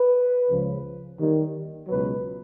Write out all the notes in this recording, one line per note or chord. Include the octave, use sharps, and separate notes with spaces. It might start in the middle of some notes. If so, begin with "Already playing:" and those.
Already playing: B4
C#2 C#3 F3
D#2 D#3 G3
C#2 B2 F#3 B4